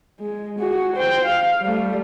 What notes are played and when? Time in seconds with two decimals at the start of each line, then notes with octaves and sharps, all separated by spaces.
0.20 G#3
0.59 F#4 G#4
0.96 C5 G5
1.26 F5
1.62 G3 A3